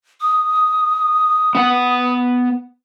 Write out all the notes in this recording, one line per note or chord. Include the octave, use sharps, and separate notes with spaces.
D#6
B3 F#5